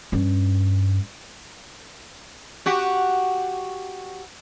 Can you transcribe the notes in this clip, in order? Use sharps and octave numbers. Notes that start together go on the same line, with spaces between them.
G2 C#4
F#4 G4